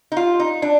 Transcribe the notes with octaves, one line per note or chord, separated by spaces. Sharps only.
D#4
F4
D#4
D4